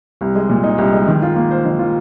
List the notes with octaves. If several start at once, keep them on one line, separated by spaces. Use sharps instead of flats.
C2
G#3
A#2
D#4
C2
G#3
D#3
F4
A#3
C5
D#3
F4